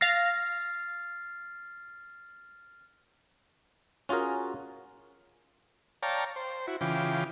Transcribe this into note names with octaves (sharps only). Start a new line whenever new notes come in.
F5 F6 A6 A#6 C7
C#4 F4 F#4 G#4 A#4
C#5 D5 F5 G5 A5 A#5
C5
E4 F#4
C#3 E3 F4 G5 D6